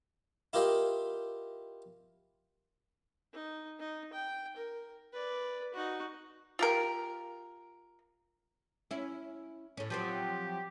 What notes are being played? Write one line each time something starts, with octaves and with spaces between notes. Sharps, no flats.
E4 F4 G4 A#4 D#5 F5
D#4
D#4
G5
A#4
B4 D5
D#4 F#4
F4 G4 A#4
C#4 E4
A2 C#4
F3 F#3 C4 G4